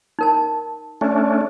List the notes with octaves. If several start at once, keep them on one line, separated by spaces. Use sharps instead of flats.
D#4 A#4 A5
A3 C#4 D4